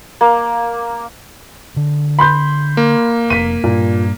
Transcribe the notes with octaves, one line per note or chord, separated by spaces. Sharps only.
A#3
D3
B5 C6 G6
A#3
F1 B6 D#7
G2 A#2